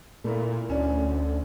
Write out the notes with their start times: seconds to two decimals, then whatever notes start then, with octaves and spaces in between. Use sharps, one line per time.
0.24 A#2 A3 E4 A#4
0.70 D2 C#4 D4